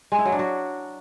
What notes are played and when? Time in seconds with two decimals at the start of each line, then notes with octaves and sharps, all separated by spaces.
0.12 G#3
0.19 E4
0.25 F#3
0.32 D4
0.39 F#4